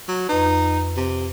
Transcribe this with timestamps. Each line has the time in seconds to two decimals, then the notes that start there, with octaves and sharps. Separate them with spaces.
0.08 F#3
0.29 F2 D#4 B4
0.97 C3